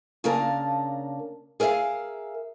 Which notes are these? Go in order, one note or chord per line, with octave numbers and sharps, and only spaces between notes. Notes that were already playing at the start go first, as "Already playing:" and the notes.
C#3 A#3 D4 A#4 A5
G#4 A#4 D5 E5 F5